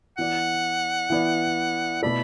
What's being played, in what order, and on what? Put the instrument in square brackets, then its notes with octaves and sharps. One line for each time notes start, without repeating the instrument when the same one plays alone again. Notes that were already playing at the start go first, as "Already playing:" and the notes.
[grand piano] E3 B3 E4 D5 [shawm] F#5
[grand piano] E3 B3 E4 D5
[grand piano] B2 A3 E4 A4 D5 [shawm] B5